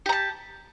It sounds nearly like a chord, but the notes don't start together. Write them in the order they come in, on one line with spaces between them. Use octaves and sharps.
G4 A#5 A5